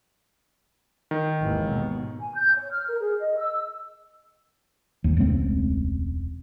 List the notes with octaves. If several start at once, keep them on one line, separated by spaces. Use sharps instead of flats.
D#3
G#1 D#2 E3
B2
G#5
G6
C#5
F6
A#4
G#4
D#5
E6
G1 D#2
E1 C#2 A3 C4